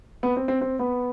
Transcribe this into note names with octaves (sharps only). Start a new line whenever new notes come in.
B3
C4
C4
C4
B3